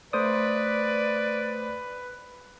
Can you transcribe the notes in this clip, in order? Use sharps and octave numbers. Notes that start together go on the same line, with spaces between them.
A3 B4 C5 D5 D#6